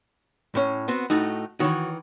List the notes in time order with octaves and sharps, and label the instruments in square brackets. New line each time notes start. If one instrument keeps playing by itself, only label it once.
[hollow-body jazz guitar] A2 C#4
B3 C4 F#4
[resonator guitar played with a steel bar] A2 A3 D#4 [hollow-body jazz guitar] F#4
[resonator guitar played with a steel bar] D#3 E3 [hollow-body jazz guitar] F#4 C#5